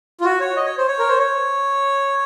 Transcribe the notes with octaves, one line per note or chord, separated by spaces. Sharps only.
F4
F#4
C#5
D#5
C#5
C5
C#5
A#4
C5
C#5